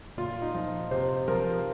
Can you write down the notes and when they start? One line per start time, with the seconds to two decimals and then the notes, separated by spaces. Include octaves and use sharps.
0.18 A#2 F4
0.42 D#4
0.54 F3
0.91 C3 C5
1.28 F3 A#4